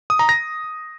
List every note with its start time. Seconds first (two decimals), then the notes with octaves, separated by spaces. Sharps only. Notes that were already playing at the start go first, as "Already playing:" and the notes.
0.10 D#6
0.19 A#5
0.29 A#6